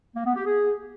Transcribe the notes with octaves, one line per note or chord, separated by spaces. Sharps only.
A#3
B3
G4
G#4